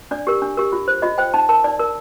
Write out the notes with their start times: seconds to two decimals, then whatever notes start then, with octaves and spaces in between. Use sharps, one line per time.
0.11 D4 D5
0.27 G4 A#4
0.42 D4
0.57 G4 A#4
0.72 F4
0.88 C5
1.02 F4 D#5
1.18 C5 G5
1.34 D#4 A5
1.49 A#4 A5
1.64 D#4 D5
1.79 A#4